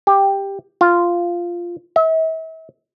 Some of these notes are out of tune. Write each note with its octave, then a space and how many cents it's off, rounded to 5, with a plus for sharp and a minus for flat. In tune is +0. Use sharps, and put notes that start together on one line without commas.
G4 +10
F4 -5
E5 -40